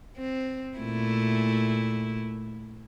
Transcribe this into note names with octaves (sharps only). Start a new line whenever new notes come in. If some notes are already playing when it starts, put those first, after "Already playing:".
C4
A#2 A3 E4